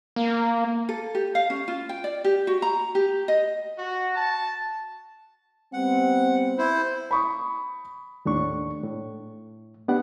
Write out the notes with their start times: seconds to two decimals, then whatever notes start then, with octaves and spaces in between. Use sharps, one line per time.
0.16 A#3
0.89 A4
1.15 G4
1.35 F5
1.50 C#4
1.68 F4
1.89 G5
2.04 D5
2.24 G4
2.47 F#4
2.62 A#5
2.95 G4
3.28 D#5
3.77 F#4
4.15 A5
5.73 G3 B3 C4 F#5
6.58 E4 C5
7.11 B5 C#6 D#6
8.25 D#2 A2 D4 C#6
8.84 A2
9.88 B3 D4 G4 F#5